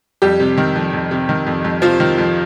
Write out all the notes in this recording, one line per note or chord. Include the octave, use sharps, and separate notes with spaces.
F2 G3 G4
C3
D#3
F2
F2
C3
D#3
F2
F2
C3 F3 F4
D#3
F2